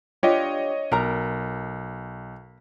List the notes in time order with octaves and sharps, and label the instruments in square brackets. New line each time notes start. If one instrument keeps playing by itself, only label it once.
[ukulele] D4 F4 G4 [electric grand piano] C#5 D#5
[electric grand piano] B1 [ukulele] A#4 A#5